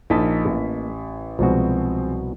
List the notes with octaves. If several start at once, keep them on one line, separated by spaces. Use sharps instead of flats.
A#1 A#3 D#4 D#5 A5 B6
A1
C2 B2 F3 G#3 C4 F#4